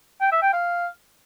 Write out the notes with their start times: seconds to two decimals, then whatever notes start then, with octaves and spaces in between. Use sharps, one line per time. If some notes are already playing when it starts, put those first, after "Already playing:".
0.21 G5
0.32 E5
0.42 G5
0.53 F5